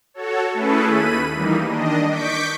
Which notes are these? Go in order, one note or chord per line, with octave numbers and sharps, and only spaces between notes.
F#4 A4 C#5
A3 C#4 E4 G#4 A4 B4
D#2 B5 D#7
E3 G3 A#3 D#4
D#3 D4 D#5
C#6 D6 G6 B6 D7